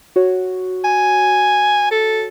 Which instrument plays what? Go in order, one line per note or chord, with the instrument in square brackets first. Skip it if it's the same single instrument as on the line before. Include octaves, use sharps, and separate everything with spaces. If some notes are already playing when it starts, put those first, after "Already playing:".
[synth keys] F#4 C#5
[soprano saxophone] G#5
A4